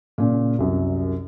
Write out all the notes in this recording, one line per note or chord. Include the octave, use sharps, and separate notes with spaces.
A#2 C#3
C2 F#2